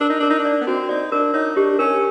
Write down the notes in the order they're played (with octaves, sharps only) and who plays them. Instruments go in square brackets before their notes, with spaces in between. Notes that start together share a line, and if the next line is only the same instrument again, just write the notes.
[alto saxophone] D4 [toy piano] A#4
[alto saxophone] D#4
[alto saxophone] D4 [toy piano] A#4
[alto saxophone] D#4
D4
[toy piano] D5
[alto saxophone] B3
[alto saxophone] C4 [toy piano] F#4
[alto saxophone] D#4 [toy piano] D5
[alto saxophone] D4 [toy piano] A#4
[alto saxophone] D#4 [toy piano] C#5
[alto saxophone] D4 [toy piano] G4
[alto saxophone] C#4 [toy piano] A#4